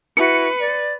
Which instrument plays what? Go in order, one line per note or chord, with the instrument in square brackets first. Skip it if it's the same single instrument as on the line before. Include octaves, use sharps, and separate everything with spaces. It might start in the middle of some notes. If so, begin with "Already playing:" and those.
[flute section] E4 F#4 [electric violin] B4 [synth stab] C#7
[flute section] D5